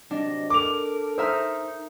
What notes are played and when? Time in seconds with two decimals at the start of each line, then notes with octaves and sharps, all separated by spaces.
0.11 C3 F#3 D4 D#5
0.50 A4 A#4 D6 F7
1.18 D#4 A#4 C5 E5 D#6